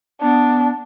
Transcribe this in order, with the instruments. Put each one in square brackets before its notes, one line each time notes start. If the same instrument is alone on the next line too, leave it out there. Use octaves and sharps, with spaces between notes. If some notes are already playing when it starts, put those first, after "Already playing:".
[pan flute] B3 [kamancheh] D4